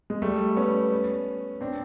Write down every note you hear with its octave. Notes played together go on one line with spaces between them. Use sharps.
G#3
G3 A3
B3 C#4
C4 D4